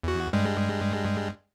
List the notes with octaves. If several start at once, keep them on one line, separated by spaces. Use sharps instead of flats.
E2 F#4
G2 G3 G#3